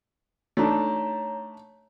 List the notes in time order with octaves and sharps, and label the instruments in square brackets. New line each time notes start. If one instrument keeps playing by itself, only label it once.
[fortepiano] A3 D4 D#4 [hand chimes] C#5 A#5